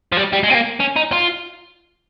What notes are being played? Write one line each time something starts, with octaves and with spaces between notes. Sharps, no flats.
F3
G3
G3
G#3
C4
A#3
C#4
D#4
F4